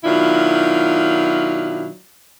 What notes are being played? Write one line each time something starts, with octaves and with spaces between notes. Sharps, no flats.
B2 D#3 F#3 D4 E4 F4